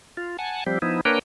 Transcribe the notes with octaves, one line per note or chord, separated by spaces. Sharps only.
F4
F#5 G#5 A5
F3 G3 C4 G4
F3 B3 D#4 E4
A#3 D4 A#4 B4 C#5 G5